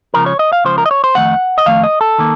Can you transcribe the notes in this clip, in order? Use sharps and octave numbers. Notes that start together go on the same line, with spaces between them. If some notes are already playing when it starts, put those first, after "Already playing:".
C#2 C#3 F3 A#4
C#5
D#5
F5
C#2 C#3 F3 C5
A#4
D#5
C#5
C5
F2 D#3 A3 F#5
D#5
F2 D#3 A3 F5
D#5
A4
D#3 A#3